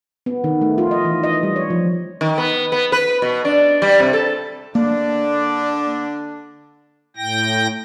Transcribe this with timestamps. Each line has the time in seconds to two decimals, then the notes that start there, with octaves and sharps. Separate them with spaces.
0.26 B3
0.44 D#3
0.61 A3
0.78 F4
0.91 D#5
1.05 E3
1.23 D#5
1.43 G3
1.56 C#5
1.70 F3
2.21 D#3
2.38 B3
2.72 B3
2.92 B4
3.22 B2
3.45 D4
3.82 G3
4.00 C3
4.13 A4
4.75 D3 A#3 D4
7.17 A2 G5 A#6